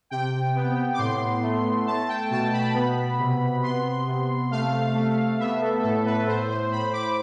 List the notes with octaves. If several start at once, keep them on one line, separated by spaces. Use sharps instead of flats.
C3 G5
B3
D6
A2 C6
A3
A3 A5
G5
B2 A5
B5
B3
C3
B3 C6
C3
A3 F5
A3
B3 E5
A4
A2 A4
B4
A2 C5
C5
A2 B5
D6